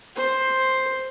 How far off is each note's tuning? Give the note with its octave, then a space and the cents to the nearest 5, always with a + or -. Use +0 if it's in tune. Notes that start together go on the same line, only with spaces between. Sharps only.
C5 +5